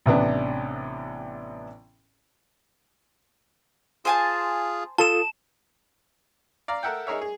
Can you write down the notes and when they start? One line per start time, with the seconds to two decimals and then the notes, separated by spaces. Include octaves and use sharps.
0.06 A1 C3 B3 D4
4.05 F4 G#4 C5 G#5 A5
4.98 F4 A4 A5 D#6 E7
6.68 D5 F5 A#5
6.83 A4 A#4 E5 F#5 G5
7.07 D#4 G#4 A#4 C#5 E5
7.21 G#4